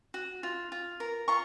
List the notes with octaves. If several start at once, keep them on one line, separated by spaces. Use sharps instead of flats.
F#4
F4
F4
A#4
F4 A#5 C#6